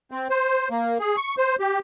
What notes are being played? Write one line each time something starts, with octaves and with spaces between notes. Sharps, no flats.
C4
C5
A#3
G#4
C#6
C5
G4